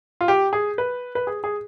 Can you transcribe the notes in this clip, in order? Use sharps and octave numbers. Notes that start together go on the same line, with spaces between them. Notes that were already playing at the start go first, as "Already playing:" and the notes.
F4
G4
G#4
B4
B4
G#4
G#4